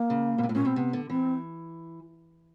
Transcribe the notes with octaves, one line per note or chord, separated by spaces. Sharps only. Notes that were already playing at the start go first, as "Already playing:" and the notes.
Already playing: A#3
C#3
B2
C3
A2
A#2 C#4
B2 C4
C3 B3
D3
E3 C4